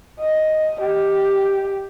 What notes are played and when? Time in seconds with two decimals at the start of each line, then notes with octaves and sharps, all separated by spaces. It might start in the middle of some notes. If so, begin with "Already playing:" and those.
0.20 D#5
0.81 G4